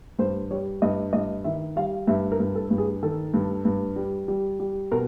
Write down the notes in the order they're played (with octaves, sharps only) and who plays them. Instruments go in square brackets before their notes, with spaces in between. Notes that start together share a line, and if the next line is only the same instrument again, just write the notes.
[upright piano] G2 C5
G3 C#5
G2 D#5
G2 D#5
D#3 E5
G3 F5
G2 E5
A#4
G2
A4
G2
G#4
D#3 A4
G2
G2
G3
G3
G3
B2 A#4